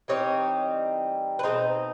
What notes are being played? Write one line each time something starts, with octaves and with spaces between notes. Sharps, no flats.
E3 G3 C4 D#4 C#5
B4
B2 G#3 C4 D#4 C5